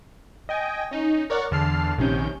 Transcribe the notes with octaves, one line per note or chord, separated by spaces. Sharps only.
D#5 G5 G#5
C#4 D#4
A#4 C#5 D5 F#5
E2 D3 A5 F6 C7
A#1 C3 D#3 C#4 G6